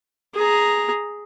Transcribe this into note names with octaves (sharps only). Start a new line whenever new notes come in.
G#4 A#5